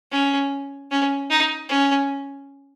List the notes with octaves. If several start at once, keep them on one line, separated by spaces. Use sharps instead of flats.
C#4
C#4
D#4
C#4